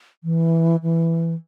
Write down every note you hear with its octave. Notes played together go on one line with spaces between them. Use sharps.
E3
E3